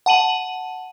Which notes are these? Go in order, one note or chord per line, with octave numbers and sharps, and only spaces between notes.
F#5 A5 D#7 F#7